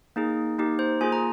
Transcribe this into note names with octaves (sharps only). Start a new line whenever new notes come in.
A#3 D#4 G#4
A#3 D#4 G4
C5
A#3 F4 G#4 G#5
A#5